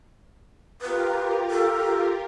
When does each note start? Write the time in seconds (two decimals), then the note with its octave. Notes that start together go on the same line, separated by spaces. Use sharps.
0.82 F4 G4 A#4 B4
1.51 A4